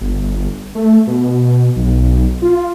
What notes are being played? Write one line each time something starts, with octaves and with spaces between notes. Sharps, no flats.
G1
A3
B2
B1
F4